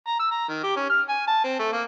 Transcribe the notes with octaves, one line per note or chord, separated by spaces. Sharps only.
A#5
E6
A#5
D#3
G4
C#4
F6
G#5
A5
C4
A3
A#3